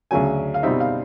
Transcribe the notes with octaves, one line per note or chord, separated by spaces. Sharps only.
D2 C#3 F#3 G#5
F5
B2 G3 C4 D#4 E5
F5